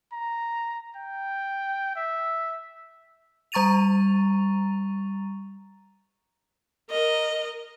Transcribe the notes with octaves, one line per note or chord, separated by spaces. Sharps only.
A#5
G5
E5
G3 A#5 C#6 A6 D#7 F7
A#4 D#5